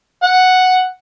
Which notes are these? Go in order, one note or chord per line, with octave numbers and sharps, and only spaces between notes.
F#5